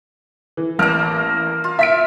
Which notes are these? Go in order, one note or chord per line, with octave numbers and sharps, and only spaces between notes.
E3
A1 A#3 A#4 A5 F6
F4
E5 B6 D7